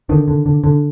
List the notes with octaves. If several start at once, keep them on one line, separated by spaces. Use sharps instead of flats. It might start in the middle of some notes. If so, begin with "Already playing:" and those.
D3 D#3
D3
D3
D3